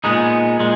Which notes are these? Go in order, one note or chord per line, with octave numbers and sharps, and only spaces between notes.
A#2 G#3 B3 D#4
A#2 G#3